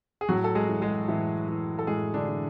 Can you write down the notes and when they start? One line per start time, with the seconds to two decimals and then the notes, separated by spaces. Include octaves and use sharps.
0.21 G#4
0.29 A2 F#3 F#4
0.44 A4
0.55 G#3 G#4
0.69 E3
0.81 G#3 G#4
1.08 A2 E3 E4
1.48 E3
1.79 A4
1.87 A2 G#3 G#4
2.14 D3 D4
2.28 E3